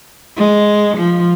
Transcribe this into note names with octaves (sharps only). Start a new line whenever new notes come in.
G#3
F3